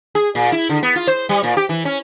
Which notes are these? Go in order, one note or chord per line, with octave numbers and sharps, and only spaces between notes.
G#4
A#2
E4
D3
B3
F4
C5
G3
A#2
G4
E3
C#4